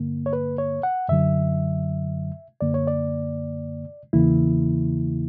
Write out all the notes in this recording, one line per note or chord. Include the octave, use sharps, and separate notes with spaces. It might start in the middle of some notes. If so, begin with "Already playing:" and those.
Already playing: G2 D3 A#3
C#5
B4
C#5
F#5
F#2 D3 F#3 E5
F#2 D3 A#3 D5
C#5
D5
E2 C#3 E3 A#3 E4